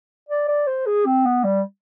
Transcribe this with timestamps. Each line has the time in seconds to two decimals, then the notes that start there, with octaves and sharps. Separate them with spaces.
0.29 D5
0.48 D5
0.67 C5
0.86 G#4
1.06 C4
1.25 B3
1.44 G3